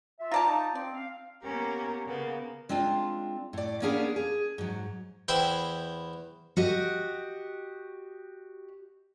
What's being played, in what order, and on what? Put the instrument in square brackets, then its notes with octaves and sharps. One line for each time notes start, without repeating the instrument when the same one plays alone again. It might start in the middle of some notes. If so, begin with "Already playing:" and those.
[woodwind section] F4 E5
[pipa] F4 D5 A5 [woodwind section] A#5
[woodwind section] D#4
[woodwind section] C4 [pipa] D5
[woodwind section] F5
[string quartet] A#3 B3 C#4 G4 A#4 A#5
C#3 A#3 B3
[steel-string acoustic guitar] G#3 C4 D4 F4
A2 D5
A#3 B3 C#4 D4 G#4 A#4
G#4
G#2 F#3
[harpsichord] E2 E4 C5 G5
[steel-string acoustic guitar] F#4 G4 D#5